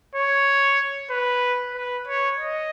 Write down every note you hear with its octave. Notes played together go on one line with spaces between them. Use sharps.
C#5
B4
B4
C#5
D#5